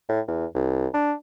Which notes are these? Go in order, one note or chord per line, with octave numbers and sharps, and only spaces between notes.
A2
E2
C2
D4